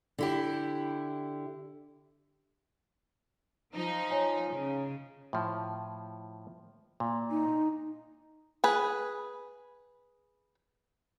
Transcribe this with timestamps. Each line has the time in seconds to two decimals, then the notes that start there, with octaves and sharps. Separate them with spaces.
0.18 D3 E4 G4
3.74 F3 D#4
4.10 C#5 G#5 A#5
4.51 C#3
5.33 A2 F3
7.00 A#2
7.31 D#4
8.64 G#4 B4